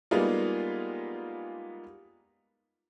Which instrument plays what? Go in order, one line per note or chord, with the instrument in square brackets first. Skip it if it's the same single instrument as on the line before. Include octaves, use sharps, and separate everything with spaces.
[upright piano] G3 G#3 A#3 B3 D#4 F4